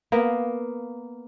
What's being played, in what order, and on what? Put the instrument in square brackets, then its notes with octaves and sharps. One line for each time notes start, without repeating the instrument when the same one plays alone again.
[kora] A#3 B3